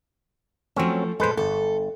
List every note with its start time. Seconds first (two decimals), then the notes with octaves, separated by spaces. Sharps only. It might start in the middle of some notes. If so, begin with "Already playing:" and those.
0.76 F3 F#3 A3 C4 C#4
1.20 A#2 G#3 A4 B4 C5
1.37 G1 A4